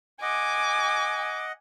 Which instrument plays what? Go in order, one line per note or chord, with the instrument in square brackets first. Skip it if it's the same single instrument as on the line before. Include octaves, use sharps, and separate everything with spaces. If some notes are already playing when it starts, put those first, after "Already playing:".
[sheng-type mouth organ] D#5 F#5 [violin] G#5 [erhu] D6